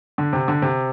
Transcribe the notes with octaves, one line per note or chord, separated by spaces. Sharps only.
D3
C3
D3
C3